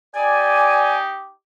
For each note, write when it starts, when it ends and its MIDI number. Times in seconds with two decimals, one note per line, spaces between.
0.16 1.31 63
0.16 1.31 67
0.16 0.99 74
0.16 0.99 80